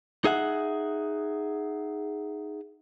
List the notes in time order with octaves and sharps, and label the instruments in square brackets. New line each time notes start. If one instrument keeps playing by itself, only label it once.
[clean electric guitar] D#4 G#4 E5 F#5